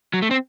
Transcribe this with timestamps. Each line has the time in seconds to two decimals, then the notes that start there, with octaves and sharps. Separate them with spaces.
0.14 F#3
0.22 A3
0.31 C4